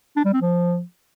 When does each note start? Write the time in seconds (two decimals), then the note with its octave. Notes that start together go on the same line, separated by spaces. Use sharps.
0.17 D4
0.25 G3
0.33 C4
0.42 F3